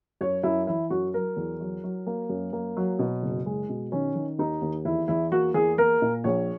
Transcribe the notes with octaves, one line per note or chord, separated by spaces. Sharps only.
F#2 C#5
F#2 E4
E3 E4
F#2 F#4
F#3 A#4
E2
F#3
F#3
A#3
F#2
A#3
F#3
B2
F#1
G#3
B2
D#3 C#4
D#3
D#2 D#4
D#2
E2 E4
E2 E4
A#3 F#4
E2 G#4
A#3 A#4
A#2
A#1 C#5